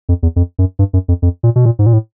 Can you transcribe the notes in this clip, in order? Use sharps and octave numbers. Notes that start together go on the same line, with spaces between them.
F2
E2
F2
F#2
G2
F#2
F2
F2
A#2
B2
A#2
G#2
A#2
A2